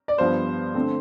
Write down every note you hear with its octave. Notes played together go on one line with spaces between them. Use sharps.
D5
G2 F3 B3 C5
D3 A3 C4